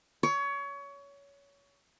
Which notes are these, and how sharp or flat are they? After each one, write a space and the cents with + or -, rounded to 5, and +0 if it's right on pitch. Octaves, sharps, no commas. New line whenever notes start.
C#5 +25